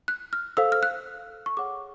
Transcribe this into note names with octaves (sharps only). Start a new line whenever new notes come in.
F#6
F6
A4 C5 F5 E6
F6
F#6
C#6
G#4 C#5 F#5 D6